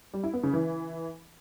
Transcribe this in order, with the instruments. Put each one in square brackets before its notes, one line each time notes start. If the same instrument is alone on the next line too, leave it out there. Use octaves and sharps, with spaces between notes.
[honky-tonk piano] G3
E4
B3
C#3
E3